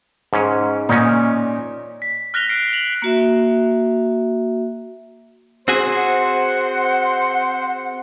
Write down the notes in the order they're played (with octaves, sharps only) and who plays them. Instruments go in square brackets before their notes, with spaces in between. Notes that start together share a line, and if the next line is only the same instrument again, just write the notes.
[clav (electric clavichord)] G#2 C#4
[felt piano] A#2 [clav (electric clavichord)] C#4 D#4
[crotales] B6
F6 F#6 A#6 B6 F7 G7
F6 C7 D7
F7 F#7
[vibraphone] A#3 F#4 E5
[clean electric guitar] C4 F#4 G#4 [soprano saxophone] C5
[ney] F#5